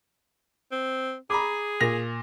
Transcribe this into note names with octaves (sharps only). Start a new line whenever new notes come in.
C4
G#4 A#5 B5 D6
A#2 A#6 F7